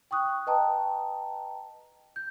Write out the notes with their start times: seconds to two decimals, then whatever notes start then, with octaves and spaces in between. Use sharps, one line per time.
0.11 G5 C#6 D#6 F#6
0.47 B4 D#5 G5 A5 A#5
2.16 G6